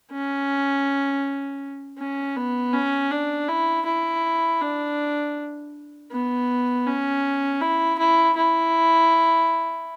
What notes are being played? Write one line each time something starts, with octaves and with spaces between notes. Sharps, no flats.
C#4
C#4
B3
C#4
D4
E4
E4
D4
B3
C#4
E4
E4
E4